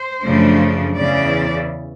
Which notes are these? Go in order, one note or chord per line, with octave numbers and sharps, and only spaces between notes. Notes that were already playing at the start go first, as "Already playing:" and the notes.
Already playing: C5
F#2 C#3 F3 A3 D4
E2 C#3 E3 D5